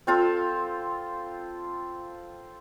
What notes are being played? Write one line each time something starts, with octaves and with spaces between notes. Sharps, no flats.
C4 F4 A4